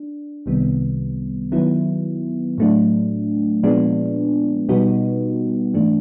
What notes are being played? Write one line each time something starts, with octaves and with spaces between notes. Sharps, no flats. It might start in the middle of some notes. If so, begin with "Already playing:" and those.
Already playing: D4
C2 C3 D#3 G3 B3
D#3 F#3 B3 E4
A2 F#3 A3 D4
A#2 F3 G#3 B3 D4
B2 G3 B3 D#4 F#4
G#2 E3 A3 D4